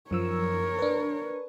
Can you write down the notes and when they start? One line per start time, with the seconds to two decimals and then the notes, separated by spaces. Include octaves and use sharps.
0.11 F#2 F3 A#4 C#5 E6
0.79 D4 B4